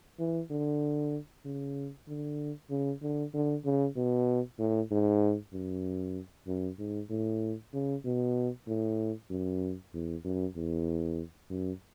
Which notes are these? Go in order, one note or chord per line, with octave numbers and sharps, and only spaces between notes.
E3
D3
C#3
D3
C#3
D3
D3
C#3
B2
A2
G#2
F#2
F#2
G#2
A2
C#3
B2
A2
F#2
E2
F#2
E2
F#2